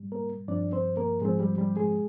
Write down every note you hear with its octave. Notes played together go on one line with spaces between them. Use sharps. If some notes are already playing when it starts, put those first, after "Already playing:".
Already playing: G#2 G3
A#3 A#4
G2 F3 C4 D4 D5
C4 C5
A#3 A#4
G#2 F3 G#3 C4 G#4
G3 G4
G3 G4
G#3 G#4